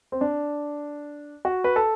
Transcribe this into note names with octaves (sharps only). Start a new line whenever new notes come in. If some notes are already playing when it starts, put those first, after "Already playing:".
C4
D4
F#4
B4
A4